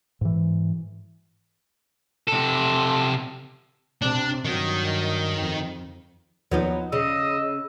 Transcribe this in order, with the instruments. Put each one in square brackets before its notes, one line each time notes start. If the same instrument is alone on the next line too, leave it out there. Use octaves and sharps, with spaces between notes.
[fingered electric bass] G#2 E3
[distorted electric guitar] C3 A4
[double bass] C3 [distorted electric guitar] D4
[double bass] G2 F#3 [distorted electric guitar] D#3
[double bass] F2
[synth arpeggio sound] D#2 F3 [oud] F#3 B3 D#4
[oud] C#3 [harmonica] D#5 D#6 [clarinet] E6